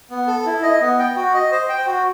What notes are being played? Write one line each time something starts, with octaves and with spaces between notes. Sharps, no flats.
B3
A4
E4
D#5
B3
G5
F#4
D#5
C5
G5
F#4